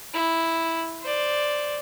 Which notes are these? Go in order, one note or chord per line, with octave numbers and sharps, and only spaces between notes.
E4
C5 D5